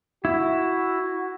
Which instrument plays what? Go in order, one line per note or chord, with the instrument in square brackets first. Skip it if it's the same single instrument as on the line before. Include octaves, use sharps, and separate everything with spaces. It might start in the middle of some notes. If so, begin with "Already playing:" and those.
[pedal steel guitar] E4 [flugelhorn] F#4